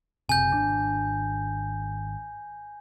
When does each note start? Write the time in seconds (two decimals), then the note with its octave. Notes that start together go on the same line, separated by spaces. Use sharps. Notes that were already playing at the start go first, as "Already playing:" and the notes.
0.29 F#1 C3 G#5 G6
0.53 G#1 D4